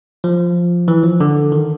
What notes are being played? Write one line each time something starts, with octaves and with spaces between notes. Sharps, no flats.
F3
E3
F3
D3
D#3